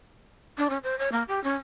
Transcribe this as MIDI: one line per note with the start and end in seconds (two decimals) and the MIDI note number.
0.58 0.68 62
0.70 0.78 61
0.83 0.97 72
0.99 1.09 73
1.12 1.23 58
1.28 1.42 67
1.44 1.55 61